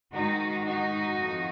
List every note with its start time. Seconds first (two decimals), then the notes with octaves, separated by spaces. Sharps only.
0.14 G#2 D#3 D#4 F#4
0.65 D#4 F#4
1.17 F2 D#3